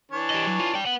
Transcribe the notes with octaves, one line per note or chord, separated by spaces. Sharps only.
E3 D4 C#5
G4 D#5
F#3
F4
D5 G5
B4 F#5